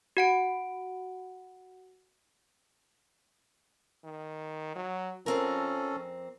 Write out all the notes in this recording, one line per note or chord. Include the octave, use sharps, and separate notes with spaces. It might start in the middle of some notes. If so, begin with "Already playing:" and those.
F#4 F#5 D7
D#3
F#3
F2 F3 C4 C#4 A4 A#4